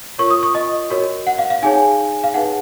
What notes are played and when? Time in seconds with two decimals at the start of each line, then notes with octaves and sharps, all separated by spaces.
0.18 F4 A#4 C#5 C#6
0.30 D#6
0.43 C#6
0.55 D#5
0.90 F#4 A#4 C#5
1.27 F#5
1.38 F5
1.50 F5
1.63 D#4 G#4 C#5 G#5
2.24 F5
2.34 D#4 G#4 B4 F#5